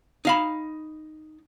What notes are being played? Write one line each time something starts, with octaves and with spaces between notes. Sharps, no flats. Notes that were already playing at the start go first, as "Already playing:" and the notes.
D#4 F5 B5